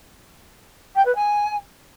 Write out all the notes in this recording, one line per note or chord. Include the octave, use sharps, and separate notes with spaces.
G5
B4
G#5